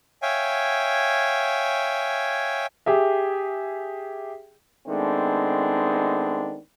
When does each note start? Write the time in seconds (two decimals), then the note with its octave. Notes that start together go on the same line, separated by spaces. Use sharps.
0.22 C#5 E5 F5 G5 G#5
2.86 G4 G#4 E5
4.88 D#3 G#3 A3 B3 C4 D4